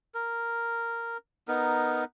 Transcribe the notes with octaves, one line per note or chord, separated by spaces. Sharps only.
A#4
B3 D#4 A#4